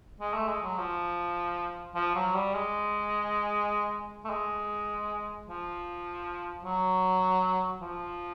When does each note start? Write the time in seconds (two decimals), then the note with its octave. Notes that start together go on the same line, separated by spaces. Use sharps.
0.20 G#3
0.34 A3
0.48 G#3
0.63 F#3
0.78 F3
1.95 F3
2.15 F#3
2.34 G3
2.54 G#3
4.25 A3
4.30 G#3
5.47 F3
6.64 F#3
7.81 F3